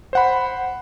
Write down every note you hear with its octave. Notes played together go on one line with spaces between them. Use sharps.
C5 F#5 B5